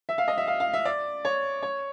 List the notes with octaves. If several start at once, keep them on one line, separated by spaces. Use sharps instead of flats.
E5
F5
D#5
E5
F5
F5
E5
D5
C#5
C#5